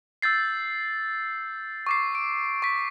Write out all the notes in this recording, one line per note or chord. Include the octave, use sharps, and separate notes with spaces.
E6 G6 A6 C7
C#6 D6 C7
D7
C#6 B6